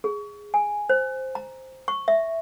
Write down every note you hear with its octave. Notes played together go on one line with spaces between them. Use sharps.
G#4
G#5
C5
A#5
C#6
E5